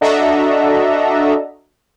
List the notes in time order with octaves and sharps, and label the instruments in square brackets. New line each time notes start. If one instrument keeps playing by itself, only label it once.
[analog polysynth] D4 F#4 A4 D#5 E5 A#5